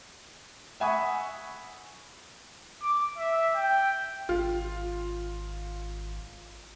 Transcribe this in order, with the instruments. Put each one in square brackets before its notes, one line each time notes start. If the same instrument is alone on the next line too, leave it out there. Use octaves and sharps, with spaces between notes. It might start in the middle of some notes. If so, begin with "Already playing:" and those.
[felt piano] E5 F#5 G#5 B5 C#6 D#6
[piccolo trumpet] D6
E5
G5
[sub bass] G#1 [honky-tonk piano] F4